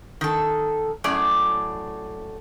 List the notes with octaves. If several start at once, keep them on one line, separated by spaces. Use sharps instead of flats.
D#3 A4
F#2 A2 G#4 D5